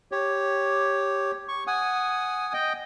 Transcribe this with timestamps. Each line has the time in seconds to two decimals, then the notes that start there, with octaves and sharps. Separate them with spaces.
0.12 G4 C#5
1.49 C#6
1.67 F#5 G#5 D#6
2.54 D#5 G5